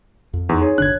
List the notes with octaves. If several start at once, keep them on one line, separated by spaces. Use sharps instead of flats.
F2
E2 D#4 C6
G#4 C#5
G1 D3 D4 F#6 G#6